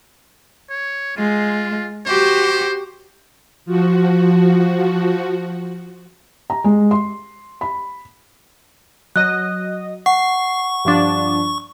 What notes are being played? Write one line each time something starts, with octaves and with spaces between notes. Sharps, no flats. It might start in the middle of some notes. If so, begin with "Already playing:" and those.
C#5
G#3 F4
F#4 G4 C5
F3 F#4
A#5
G#3
C6
B5
F#3 D#5 F#6
F#5 C#6 C7
G2 F3 D4